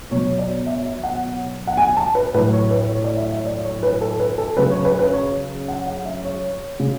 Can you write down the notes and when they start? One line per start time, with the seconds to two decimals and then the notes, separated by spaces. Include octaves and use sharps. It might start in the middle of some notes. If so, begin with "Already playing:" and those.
0.11 B2 F#3 C#5
0.38 D5
0.67 E5
0.86 E5
1.03 F#5
1.67 F#5
1.77 G#5
1.97 A5
2.15 B4
2.34 A2 B4
2.38 F#3
2.53 C#5
2.71 B4
2.89 C#5
3.04 D5
3.17 E5
3.31 E5
3.46 D5
3.65 C#5
3.83 B4
4.01 A4
4.20 B4
4.38 A4
4.57 C#3 F#3 B4
4.71 C#5
4.85 B4
4.99 B4
5.13 C#5
5.68 F#5
5.87 F#5
6.05 E5
6.24 C#5
6.80 C#3